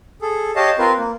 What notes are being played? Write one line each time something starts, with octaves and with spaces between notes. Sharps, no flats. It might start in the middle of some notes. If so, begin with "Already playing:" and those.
G#4 A4
G4 C#5 D#5 F5 A5
C4 F4 A#4 B4
A#3